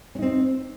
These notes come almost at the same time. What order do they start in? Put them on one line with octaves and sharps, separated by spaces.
C#4 D#4 C4